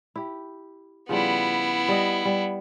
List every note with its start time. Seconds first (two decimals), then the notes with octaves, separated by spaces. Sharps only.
0.16 E4 G4
1.09 C#3 F3 G3 B3 E4
1.88 G3 D#5
2.25 G3